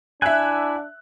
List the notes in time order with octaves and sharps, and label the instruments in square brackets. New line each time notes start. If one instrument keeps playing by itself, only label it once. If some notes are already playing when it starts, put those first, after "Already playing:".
[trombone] D4 [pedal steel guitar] E4 F#5 G#5 [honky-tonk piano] E5 F#6